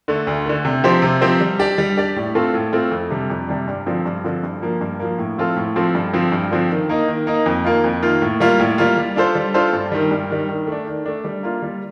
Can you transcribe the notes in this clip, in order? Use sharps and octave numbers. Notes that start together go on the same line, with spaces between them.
D3 A3
D2
D3 A3
C3
F3 C4 G4 C5
C3
F3 C4 G4 C5
G3
D4 G4 D5
G3
D4 G4 D5
A2
A3 C4 F4 A4
A2
A3 C4 F4 A4
F2
C3 G3 D4
F2
C3 G3 D4
G2
D3 F3 C4
G2
D3 F3 C4
G2
F3 A#3
G2
F3 A#3
A2
F3 C4 F4 A4
A2
F3 C4 F4 A4
G2
D3 F3 C4
G2
D3 F3 C4
D#3
A#3 D#4
D#3
A#3 D#4
F2
D#3 A#3 F4
F2
D#3 A#3 F4
A2
G3 A#3 F4
A2
G3 A#3 F4
G3
D4 F4 A4 C5
G3
D4 F4 A4 C5
G2
D#3 G3
G2
D#3 G3
D#3
A3 D4
D#3
A3 D4
G3
A#3 F4
G3